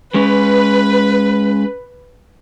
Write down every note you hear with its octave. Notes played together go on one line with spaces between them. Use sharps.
G#3 C#4 B4